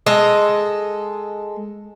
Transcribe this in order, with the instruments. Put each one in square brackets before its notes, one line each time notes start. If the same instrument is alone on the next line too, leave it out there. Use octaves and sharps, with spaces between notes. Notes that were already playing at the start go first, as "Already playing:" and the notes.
[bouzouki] G#3 A4 D#5